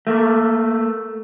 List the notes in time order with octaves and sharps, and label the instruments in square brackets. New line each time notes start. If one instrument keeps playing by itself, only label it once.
[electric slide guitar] A3 A#3